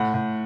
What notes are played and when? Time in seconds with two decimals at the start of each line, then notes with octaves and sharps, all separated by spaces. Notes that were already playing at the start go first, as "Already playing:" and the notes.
Already playing: A2 F#5
0.14 A2